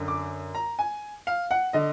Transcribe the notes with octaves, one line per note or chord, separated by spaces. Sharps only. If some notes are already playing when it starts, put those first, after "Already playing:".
Already playing: F#2 D3
D6
A#5
G#5
F5
F#5
D3 D#5